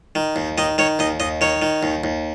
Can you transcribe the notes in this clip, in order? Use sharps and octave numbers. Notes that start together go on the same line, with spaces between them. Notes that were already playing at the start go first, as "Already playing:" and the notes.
D#3
D#2
D#3 D#5
D#3 C#5
D#2 D#5
D#2 D#5
D#3 C#5
D#3
D#2
D#2